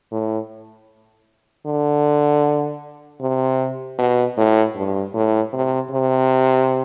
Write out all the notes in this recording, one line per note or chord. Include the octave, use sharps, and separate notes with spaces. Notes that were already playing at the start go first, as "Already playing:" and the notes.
A2
D3
C3
B2
A2
G2
A2
C3
C3